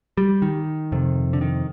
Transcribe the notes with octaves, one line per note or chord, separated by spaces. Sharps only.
G3
D#3
F2 C3
D3
D#3